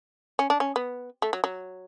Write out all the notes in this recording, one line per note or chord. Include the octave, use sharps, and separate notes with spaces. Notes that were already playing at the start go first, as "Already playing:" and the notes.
C#4
D4
C#4
B3
A3
F#3
F#3